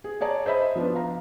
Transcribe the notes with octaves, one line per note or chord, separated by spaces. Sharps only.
G#4
G#4 C#5 D5 A5 A#5
C5 D#5 E5 B5
F3 B3 D4
F5 A#5